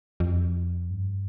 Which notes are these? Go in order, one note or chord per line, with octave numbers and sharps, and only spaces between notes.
F2
G2